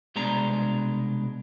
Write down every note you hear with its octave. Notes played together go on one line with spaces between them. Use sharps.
C2 B2 G#3 D4 A#5